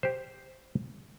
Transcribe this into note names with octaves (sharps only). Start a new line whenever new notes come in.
G4 C5